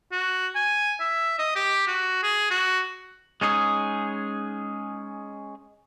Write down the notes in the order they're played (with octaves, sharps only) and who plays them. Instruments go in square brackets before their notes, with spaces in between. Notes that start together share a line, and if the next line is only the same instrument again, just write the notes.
[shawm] F#4
G#5
E5
D#5
G4
F#4
G#4
F#4
[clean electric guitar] G#3 C#4 D#4 G#4